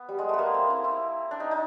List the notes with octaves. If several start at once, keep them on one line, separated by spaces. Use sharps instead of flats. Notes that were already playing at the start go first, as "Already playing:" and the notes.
Already playing: B3
G3
G#3
A3 B3
A#3
C4
E4
E4
D4
D#4
D#4